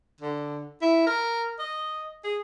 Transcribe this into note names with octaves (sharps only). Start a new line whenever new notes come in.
D3
E4
A#4
D#5
G#4